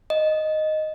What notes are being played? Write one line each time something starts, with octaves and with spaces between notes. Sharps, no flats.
D#5